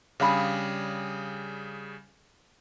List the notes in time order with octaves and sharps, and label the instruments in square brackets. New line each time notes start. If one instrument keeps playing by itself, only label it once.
[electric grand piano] C#3 G3 G#4 [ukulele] D4 F5 B5